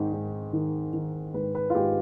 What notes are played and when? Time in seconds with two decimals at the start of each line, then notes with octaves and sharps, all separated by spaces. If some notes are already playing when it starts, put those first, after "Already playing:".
Already playing: G#2 D#3
0.12 G#2
0.53 D#3
0.93 D#3
1.34 G#2 B4
1.55 B4
1.70 F4
1.75 G#2 G4